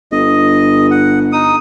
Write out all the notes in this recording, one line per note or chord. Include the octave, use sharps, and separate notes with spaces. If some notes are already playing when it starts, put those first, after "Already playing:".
G1 D#5
F#5
D#4 D#6